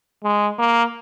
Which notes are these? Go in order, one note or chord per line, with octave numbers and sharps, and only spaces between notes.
G#3
A#3